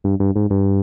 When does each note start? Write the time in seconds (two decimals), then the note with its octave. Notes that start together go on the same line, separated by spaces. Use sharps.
0.04 G2
0.20 G2
0.36 G#2
0.50 G2